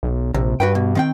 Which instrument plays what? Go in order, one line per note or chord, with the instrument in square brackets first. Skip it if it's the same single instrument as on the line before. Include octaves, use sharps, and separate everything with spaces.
[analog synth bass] B1
[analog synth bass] A#1 [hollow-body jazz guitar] C3
[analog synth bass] G2 [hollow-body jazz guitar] F#4 B4 G5
[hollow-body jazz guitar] B2
D#3 C4 G5